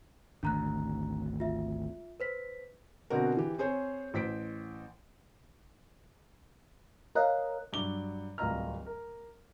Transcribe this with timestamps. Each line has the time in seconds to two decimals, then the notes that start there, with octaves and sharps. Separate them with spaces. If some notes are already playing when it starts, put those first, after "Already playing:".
0.43 G#1 D2 D4 A#5 F#6
1.40 F4 E5
2.20 B4 C5 B6
3.10 B2 D3 C4 F#4 A#4
3.37 E3 G4
3.58 C4 G#4 C5 C#5
4.14 A1 C5 B6 D7
7.15 A#4 C#5 D#5 F5 F#6
7.73 G2 F#3 D6 G7
8.38 D1 C2 F4 D#5 A#5 F6
8.86 A#4